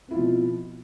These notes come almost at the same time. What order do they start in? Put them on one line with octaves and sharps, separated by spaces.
C4 E4 F4 F3 B2